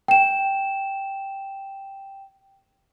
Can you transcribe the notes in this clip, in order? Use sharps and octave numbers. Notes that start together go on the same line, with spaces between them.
G5 E7